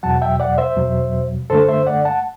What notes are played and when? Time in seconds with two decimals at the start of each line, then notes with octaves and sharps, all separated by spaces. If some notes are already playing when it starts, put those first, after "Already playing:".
0.03 E2 B2 F#3 F#5 A5
0.22 E5 G5
0.40 D5 F#5
0.58 C5 E5
0.76 E2 B2 F#3
1.50 G2 D3 A3 A4 C5
1.69 C5 E5
1.87 D5 F#5
2.05 F#5 A5